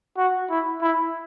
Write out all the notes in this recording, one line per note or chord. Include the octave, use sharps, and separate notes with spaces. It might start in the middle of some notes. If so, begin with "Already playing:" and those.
F#4
E4
E4